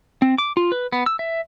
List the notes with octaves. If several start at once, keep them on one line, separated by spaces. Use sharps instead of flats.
C4
D6
F4
B4
B3
E6
E5